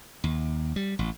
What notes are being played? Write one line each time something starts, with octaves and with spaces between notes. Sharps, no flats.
D#2
G3
A1